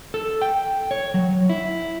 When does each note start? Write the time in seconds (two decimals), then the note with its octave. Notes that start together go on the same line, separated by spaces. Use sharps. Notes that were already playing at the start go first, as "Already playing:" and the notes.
0.14 A4
0.42 G5
0.91 C#5
1.14 F#3
1.49 E4